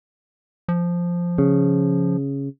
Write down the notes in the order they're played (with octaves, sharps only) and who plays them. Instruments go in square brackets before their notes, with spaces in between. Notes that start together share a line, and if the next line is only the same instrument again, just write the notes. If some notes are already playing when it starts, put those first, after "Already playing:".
[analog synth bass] F3
[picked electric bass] C#3